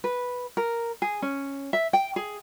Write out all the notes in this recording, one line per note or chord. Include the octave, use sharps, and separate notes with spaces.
B4
A#4
G#4
C#4
E5
G5
G#4